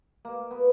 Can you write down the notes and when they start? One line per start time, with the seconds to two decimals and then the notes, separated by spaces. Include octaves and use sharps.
0.25 A#3
0.51 B3